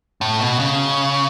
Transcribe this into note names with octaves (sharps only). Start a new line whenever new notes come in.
A2
B2
C#3